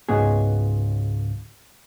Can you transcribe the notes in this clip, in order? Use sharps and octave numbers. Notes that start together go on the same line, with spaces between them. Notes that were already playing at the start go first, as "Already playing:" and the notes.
C#2 G#2 F#3 B3 G#4